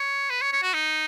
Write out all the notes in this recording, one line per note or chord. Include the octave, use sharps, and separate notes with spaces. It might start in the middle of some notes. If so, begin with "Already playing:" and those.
Already playing: C#5
B4
C#5
C#5
F#4
D#4